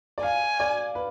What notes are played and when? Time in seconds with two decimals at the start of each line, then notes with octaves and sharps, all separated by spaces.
0.18 D5
0.23 F5 G#5
0.60 D5
0.95 B4